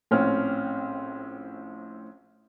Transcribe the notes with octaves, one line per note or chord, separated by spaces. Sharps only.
A#1 A2 C4 C#4 F6